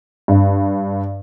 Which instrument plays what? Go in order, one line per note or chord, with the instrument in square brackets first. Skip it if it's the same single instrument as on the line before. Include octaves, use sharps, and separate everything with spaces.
[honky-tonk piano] G2